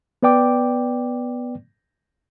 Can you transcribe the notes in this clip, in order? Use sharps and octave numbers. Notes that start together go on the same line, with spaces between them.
B3 B4 D5 G5 D6